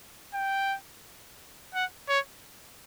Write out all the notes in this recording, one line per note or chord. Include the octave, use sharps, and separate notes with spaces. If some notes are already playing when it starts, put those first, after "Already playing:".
G5
F#5
C#5